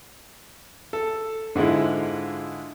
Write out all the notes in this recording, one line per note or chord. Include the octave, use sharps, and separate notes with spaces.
A4
G#2 D3 G#3 E4 F4